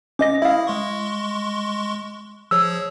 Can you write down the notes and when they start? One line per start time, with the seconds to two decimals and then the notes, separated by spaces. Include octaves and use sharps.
0.19 C#4 D#5 D6 A#6
0.42 E4 E5 F5 D#6
0.67 G#3 C6 C#6
2.51 F3 G#4 C#5 E6